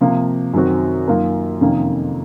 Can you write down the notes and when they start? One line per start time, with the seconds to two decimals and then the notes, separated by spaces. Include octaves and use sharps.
0.01 C3 F3 A#3
0.54 F#2 D#3 F#3 C4 F#4
1.07 F#2 D#3 A#3 F4 A#4
1.61 F2 C3 D#3 A#3 C#4